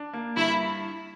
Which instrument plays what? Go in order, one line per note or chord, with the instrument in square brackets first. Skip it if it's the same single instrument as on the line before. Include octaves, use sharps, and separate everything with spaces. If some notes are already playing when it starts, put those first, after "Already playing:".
Already playing: [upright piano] D4
A#3
[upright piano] G2 [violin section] E4